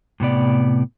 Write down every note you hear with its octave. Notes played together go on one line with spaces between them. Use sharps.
A2 C3 B3 D5